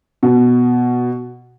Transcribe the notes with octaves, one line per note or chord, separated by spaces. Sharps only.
B2